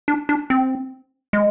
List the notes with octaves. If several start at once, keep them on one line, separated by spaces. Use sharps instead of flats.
D4
D4
C4
G#3